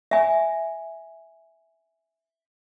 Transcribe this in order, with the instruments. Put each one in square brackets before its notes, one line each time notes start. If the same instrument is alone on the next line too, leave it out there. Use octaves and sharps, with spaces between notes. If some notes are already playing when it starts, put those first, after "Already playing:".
[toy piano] E5 G#5